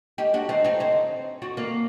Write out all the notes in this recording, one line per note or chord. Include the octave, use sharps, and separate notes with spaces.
D#4 G4
D4 F#4
C4 D#4
C4 D#4
C4 D#4
D4 F#4
A#3 D4